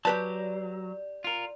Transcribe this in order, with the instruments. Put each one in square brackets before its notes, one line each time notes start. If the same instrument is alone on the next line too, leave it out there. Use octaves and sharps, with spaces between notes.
[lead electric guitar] F#3 [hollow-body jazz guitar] G4 B4 A5 [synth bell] D5
[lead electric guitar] F4 A#4